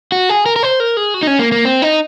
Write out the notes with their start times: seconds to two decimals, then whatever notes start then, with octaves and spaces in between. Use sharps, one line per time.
0.12 F#4
0.29 G#4
0.46 A#4
0.56 A#4
0.63 C5
0.80 A#4
0.97 G#4
1.14 F#4
1.23 D#4
1.27 C#4
1.39 A#3
1.52 A#3
1.65 C4
1.82 D#4